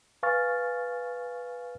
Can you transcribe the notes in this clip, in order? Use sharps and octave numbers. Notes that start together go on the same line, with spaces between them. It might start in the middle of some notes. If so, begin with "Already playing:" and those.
B4 F5 G#5 C#6 F6 A6